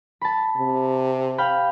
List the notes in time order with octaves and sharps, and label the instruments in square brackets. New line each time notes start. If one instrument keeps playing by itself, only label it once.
[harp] A5 B5
[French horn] C3
[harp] F5 G5 B5